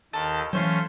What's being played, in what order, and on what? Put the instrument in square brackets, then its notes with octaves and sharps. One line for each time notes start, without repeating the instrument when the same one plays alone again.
[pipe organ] D#2 D#3 [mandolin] A4
[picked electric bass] E3 F#3 [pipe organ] A3 C#4 [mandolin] C5 F5